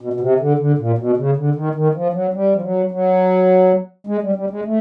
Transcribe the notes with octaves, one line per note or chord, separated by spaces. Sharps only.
B2
B2
C3
D3
D3
A#2
B2
C#3
D3
D#3
D#3
F3
F#3
G3
F3
F#3
F#3
G#3
G3
G3
G#3
A3